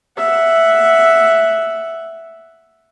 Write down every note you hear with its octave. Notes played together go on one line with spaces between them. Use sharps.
E5 F#5